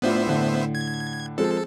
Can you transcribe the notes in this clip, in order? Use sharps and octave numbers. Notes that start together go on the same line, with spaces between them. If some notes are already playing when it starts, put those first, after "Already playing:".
A2 B3 D4 F4 C5 E5
A2 D3
G#6
F3 G#3 C4 A4